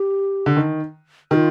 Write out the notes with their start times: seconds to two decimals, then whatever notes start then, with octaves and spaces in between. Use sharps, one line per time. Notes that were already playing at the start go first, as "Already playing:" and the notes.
Already playing: G4
0.46 D3
0.56 D#3
1.31 D#3 F4 G4